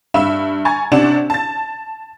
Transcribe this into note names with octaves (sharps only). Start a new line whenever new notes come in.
G2 E5 B5 E6 E7
G#5 A#5 C#6 G#6 A6
C3 C#4 D4 D5 F#5 E7
A5 A6